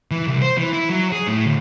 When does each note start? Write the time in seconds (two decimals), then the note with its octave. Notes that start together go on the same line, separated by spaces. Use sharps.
0.11 E3
0.28 C2
0.42 C5
0.58 E3
0.73 E4
0.89 F#3
1.12 G#4
1.27 A2
1.46 D2